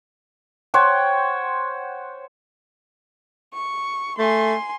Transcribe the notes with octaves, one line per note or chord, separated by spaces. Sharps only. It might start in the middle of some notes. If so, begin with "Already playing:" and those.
C5 C#5 F#5 G5
C#6
A3 G#5 C6